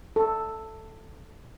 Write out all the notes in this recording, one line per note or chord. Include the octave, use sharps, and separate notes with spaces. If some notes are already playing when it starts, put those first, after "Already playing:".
A4